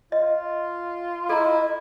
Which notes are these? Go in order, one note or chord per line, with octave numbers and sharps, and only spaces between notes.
F4 D#5
E4 A4 D#5 A#5